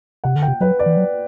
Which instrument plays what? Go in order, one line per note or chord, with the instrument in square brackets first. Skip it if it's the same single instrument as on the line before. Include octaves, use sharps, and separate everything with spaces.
[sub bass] C3 [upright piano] F#5
[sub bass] D3
[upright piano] G5
[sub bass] C3
[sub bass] F#3 [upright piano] B4
[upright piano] D5
[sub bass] E3
F#3